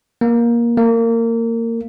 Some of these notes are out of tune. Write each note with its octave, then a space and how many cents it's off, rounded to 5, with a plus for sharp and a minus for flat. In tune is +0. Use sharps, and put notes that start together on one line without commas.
A#3 +15
A#3 -25